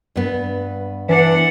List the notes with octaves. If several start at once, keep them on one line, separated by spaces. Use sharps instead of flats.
G2 B3
E3 D4 F#5